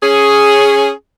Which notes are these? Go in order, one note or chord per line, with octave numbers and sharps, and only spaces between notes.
C#4 G#4